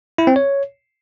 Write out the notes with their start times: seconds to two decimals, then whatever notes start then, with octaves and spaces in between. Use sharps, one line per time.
0.18 E4
0.27 C4
0.36 C#5